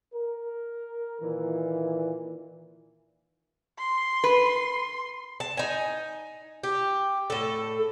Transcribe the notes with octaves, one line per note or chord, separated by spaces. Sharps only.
A#4
A#2 D#3 E3
C6
B4
A5
D#4 G#5
G4
A2 A4